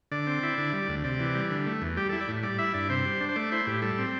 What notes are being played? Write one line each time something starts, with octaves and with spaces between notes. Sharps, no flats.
D3 D5
C4
E4
D3
G3
D2
C3 D5
E3
G3
D3
A3
E2
G3 G4
E4 A4
D5
A2
G3 D5
E4 E5
G2 D5
C3 C5
G3
D4
C5
A3 D5
E4 C5
A2 G4
G3 A4
C4